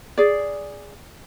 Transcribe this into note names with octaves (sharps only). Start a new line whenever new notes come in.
G#4 D5